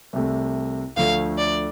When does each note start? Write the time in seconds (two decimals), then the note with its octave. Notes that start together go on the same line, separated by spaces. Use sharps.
0.13 C2 C3 A3
0.97 D2 D3 F3 A3 F5
1.38 D5